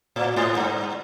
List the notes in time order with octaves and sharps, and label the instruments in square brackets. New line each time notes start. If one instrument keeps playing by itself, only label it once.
[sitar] A2
G#2
G2